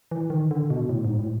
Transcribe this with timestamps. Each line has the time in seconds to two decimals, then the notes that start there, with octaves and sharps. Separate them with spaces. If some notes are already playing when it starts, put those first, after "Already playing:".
0.11 E3
0.30 D#3
0.51 D3
0.70 B2
0.89 A2
1.05 G#2
1.19 A2